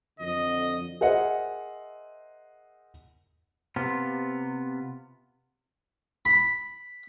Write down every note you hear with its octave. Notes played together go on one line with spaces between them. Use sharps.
F2 D3 D#5
G#4 A#4 C5 D#5 E5 F#5
C3 B3 F4
B5